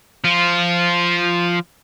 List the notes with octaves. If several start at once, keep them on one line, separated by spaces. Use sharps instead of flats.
F3 F4